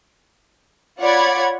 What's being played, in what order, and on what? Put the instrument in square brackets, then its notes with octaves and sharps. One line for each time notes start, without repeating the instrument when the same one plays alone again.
[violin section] F4 C#5 D5 F#5 B5 G#6